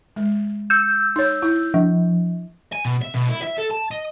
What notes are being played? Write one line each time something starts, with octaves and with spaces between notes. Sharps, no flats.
G#3
E6 G6
D#4 C#5
E4
F3
G#5
B2
E5
B2
E4
E5
A4
A5
D#5